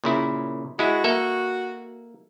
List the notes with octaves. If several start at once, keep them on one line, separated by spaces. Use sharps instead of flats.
A#2 C#3 E4
G#3 E4 F#4
A#3 A4 E5